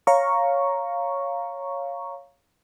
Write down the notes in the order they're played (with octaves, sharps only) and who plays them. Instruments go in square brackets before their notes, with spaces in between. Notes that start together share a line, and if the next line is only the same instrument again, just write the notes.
[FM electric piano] C#5 F5 A#5 C#6